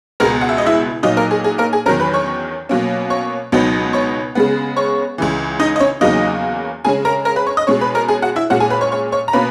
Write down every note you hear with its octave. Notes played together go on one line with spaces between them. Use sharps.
C#2 B2 G#3 B3 A#4 A#5
F#5
E5
D#5
E4 E5
A#2 F#3 A#3 D#4 D#5
A#3 A#4
G#4
G#4
A#3 A#4
G#4 G#5
E2 D#3 F#3 C#4 A#4 A#5
B4 B5
C#5 C#6
B2 F#3 A#3 C#4
C#5 C#6
C#2 B2 F#3 B3 D#4
C#5 C#6
C#3 G#3 B3
C#5 C#6
C#2 C#3 E3
D#4 D#5
D#5
C#4 C#5
E2 C#3 F#3 A#3 D#4 D#5
C#3 G#3 C#4 G#4 G#5
A#4 A#5
A#4 A#5
B4 B5
C#5 C#6
D#5 D#6
B2 G#3 C#4 C#5 C#6
B4 B5
A#4 A#5
G#4 G#5
F#4 F#5
E4 E5
A#2 G#3 C#4 F#4 F#5
G#4 G#5
B4 B5
C#5 C#6
C#5 C#6
C#5 C#6
A#5
B2 A#3 C#4 B4 B5